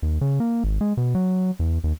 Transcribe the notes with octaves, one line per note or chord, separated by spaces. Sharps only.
D#2
C#3
A#3
G#1
G#3
B2
F#3
E2
D#2